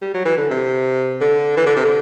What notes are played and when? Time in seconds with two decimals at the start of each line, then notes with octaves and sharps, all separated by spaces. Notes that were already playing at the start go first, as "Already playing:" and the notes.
0.02 G3
0.14 F#3
0.25 E3
0.38 D3
0.51 C3
1.21 D3
1.57 E3
1.67 D3
1.76 C3
1.85 D3